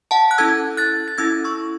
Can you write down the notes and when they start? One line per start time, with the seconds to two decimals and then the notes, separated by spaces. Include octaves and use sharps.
0.11 F#5 A5
0.31 F#6
0.38 C#4 E4 A4 E6 G#6
0.77 F#6 A6
1.08 A6
1.18 C#4 E4 A4 E6 G#6
1.44 C#6 E6